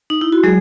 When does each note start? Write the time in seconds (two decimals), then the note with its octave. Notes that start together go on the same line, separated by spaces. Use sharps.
0.10 D#4
0.21 E4
0.32 F#4
0.43 F#3 G#3 G#4